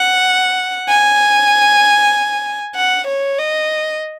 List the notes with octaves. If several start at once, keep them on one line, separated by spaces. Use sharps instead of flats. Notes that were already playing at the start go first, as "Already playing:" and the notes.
Already playing: F#5
G#5
F#5
C#5
D#5